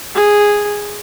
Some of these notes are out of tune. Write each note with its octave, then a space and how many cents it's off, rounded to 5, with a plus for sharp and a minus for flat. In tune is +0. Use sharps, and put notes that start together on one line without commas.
G#4 -5